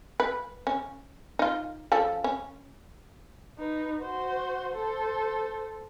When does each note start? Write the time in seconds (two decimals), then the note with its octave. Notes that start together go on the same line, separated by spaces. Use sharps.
0.20 B4
0.67 C#4
1.39 D#4 F4
1.92 F3 C#4 A4
2.24 C#4
3.58 D#4 B4
4.02 F#4 C5
4.73 A4 C5